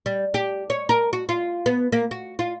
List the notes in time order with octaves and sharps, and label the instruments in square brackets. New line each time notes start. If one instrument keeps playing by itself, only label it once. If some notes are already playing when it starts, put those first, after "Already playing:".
[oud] G3
G4
C#5
A#4
F#4
F4
B3
A#3
F#4
F4